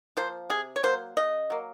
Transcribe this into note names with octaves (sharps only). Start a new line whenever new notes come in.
F3 A#3 C5
C3 G#4
C#5
F#3 A#3 C5
C#3 D#5
F#3 A#3